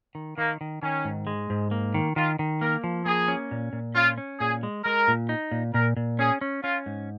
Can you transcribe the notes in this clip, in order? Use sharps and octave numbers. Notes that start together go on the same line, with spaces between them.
D#3
D#3 A#3
D#3
D#3 C#4
G#2
G#3
G#2
A#3
D#3
D#3 F4
D#3
A#3 A#4
F3
A#3 G#4
C#4
A#2
A#2
C#4 F4
C#4
A#2 G#4
G#3
G#3 A#4
A#2
D#4
A#2
A#2 A#4
A#2
C#4 G#4
C#4
C#4 F4
G#2